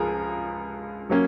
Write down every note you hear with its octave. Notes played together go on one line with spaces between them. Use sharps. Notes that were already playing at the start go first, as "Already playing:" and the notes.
Already playing: C#2 F3 G#4 A#4
F#3 A#3 C#4